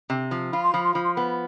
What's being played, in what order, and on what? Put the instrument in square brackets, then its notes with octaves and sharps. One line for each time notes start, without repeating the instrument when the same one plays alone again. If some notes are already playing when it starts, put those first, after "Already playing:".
[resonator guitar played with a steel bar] C3
F3
[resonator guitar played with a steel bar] F4 [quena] B5
[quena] C6
[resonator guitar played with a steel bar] F3 [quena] B5
[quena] C6
[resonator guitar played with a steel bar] F3 [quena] B5
[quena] C6
[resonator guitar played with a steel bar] B3 [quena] B5